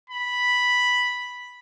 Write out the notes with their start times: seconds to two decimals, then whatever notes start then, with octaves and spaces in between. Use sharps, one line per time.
0.10 B5